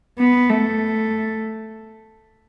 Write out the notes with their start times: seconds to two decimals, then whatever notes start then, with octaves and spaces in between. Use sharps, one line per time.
0.20 B3
0.50 A3